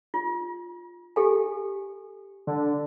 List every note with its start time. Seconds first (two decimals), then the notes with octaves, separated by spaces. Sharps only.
0.14 F4
1.16 G4 A4 G#5
2.47 D3